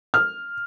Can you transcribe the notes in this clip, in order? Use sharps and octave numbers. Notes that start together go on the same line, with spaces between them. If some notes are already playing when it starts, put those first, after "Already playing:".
F6